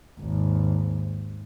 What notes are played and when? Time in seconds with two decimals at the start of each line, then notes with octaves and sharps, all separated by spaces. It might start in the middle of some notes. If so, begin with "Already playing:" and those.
0.19 G#1 D#2